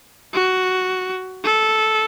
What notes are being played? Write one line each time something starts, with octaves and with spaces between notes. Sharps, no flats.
F#4
A4